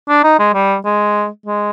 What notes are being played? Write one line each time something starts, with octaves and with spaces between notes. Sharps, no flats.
D4
D#4
G#3
G3
G#3
G#3